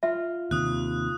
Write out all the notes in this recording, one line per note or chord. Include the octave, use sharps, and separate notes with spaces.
F4 E5
D#2 C3 D#6 F#6